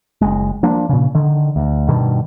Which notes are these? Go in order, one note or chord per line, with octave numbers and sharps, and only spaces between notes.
F#1 G#3
F3 A#3 D4
A#2 C#3
D3 D#3
D2
G2 B2 D#3